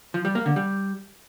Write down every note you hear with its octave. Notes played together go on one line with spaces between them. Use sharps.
F3
G3
A#3
D3
G3